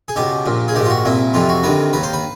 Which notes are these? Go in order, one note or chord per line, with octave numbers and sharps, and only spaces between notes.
G#4
C#2 B2 G4
A#1 A#2
G#4
A#1 G#2 D#3 G4
F4
F#4
C2 A#2 E4
F2 C3 E3 F4
F#4
D2 C3 D#3 B4
D#2 D#3 B4
C5
B4